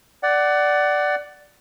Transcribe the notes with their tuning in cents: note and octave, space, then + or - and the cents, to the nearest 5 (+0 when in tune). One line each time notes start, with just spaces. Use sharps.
D5 +0 F#5 +20